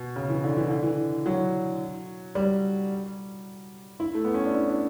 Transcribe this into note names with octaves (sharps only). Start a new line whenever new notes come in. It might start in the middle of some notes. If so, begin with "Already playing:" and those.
Already playing: B2
C#3
E3
D3
E3
D3
E3
F#3
G3
E4
A3
B3
C#4
D4
E4
D4